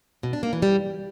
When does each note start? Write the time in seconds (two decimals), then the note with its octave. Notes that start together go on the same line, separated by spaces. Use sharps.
0.23 B2
0.33 D4
0.43 A#3
0.53 E3
0.62 G3